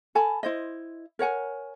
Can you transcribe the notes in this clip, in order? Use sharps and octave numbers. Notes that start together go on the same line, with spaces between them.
A4 G#5 A5 B5
E4 C5 D#5
A#4 C#5 F#5 G#5